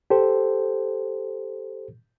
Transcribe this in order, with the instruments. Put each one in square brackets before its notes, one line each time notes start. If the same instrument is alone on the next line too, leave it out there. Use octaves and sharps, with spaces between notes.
[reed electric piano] G4 A4 C5